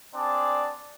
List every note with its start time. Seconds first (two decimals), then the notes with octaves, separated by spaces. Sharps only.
0.14 C4 D4 G#4 D5 A5